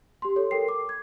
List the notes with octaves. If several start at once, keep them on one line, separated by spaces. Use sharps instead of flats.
G4 C6
A4 C#5
A4 A#4 G5 C7
D6
G#6